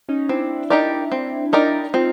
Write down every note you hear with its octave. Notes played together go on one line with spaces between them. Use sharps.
C#4 D#4
C4 D4 E4
D#4 G4 A#4 D5
C4
D#4 G4 A#4 D5
C4 D#4 F4